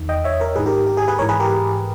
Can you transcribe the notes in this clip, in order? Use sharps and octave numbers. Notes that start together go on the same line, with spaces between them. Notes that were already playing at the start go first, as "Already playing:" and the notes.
Already playing: E2 D#3
D#5 G5
C#5 E5
A#4 C#5
G#2 D#3 G#4 B4
G4 A#4
G4
G#4
G#4 B4
G#2 E3 A#4 C#5
G#4 B4
G4 A#4